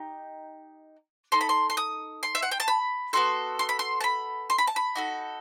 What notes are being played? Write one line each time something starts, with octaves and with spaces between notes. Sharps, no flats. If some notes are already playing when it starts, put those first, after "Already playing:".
Already playing: D#4 G4
D#4 A4 C6
B5
C6
C6
D#6
C6
E5
F#5
G5
A5
B5
B3 F#4 A4 C6
C6
B5
C6
A5
B5
C6
B5
A5
B5
D#4 F#4 A4